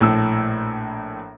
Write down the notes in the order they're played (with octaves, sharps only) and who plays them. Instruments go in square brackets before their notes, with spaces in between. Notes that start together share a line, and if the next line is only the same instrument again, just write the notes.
[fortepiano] A#1 A2 E6